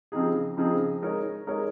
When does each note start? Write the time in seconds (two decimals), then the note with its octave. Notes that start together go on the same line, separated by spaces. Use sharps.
0.12 C#3 F3 C4 D#4 G#4
0.57 C#3 F3 C4 D#4 G#4
1.02 G#3 D#4 A#4 C#5
1.47 G#3 D#4 A#4 C#5